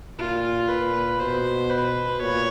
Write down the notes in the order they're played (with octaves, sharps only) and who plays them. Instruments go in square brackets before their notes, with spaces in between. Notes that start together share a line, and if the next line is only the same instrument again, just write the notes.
[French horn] A#2 [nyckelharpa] F4
[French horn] A#2 [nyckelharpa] B4
[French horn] B2 [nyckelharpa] C5
[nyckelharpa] B4
[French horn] A#2 [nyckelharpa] C#5